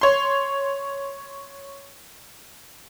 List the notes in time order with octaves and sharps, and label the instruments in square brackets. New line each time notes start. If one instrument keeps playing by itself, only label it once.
[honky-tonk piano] C#5 C6